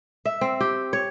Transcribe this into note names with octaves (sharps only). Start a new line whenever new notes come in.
E5
C4
G4
C#5